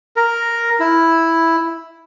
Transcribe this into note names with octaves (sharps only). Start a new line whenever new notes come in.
A#4
E4